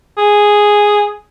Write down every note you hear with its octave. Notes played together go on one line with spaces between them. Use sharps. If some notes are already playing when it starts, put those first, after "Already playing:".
G#4